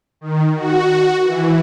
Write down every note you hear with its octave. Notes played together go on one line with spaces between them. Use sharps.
D#3
F#4
E3